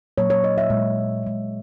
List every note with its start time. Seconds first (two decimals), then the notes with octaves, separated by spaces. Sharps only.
0.18 A#2 F#3 A#3 C#5
0.30 C#5
0.44 D#5
0.58 E5
0.70 A#2 G#3
1.23 A#2 G#3